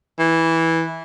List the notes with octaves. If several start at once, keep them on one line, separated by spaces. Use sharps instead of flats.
E3